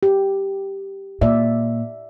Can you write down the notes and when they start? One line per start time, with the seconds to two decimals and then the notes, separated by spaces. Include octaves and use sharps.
0.03 G4
1.21 A#2 D5 E5